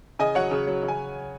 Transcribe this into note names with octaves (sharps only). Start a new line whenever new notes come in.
C#3 D#5 G#5
F#3 C#5 F#5
C#3
F#3
C#3
G#5